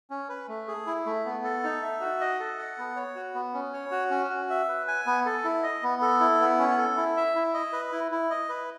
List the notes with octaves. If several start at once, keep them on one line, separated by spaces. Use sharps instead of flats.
C#4
B4
A3
G#4
E4
A3
B3
A4
D#4
E5
F#4
D#5
A4
F#5
B3
C#5
F#4
B3
C#4
C#5
F#4
C#4
F#4
E5
B4
G#5
B3
A4
E4
D#5
B3
A4
E4
B3
C#4
A4
E4
E5
E4
D#5
B4
E4
E4
D#5
B4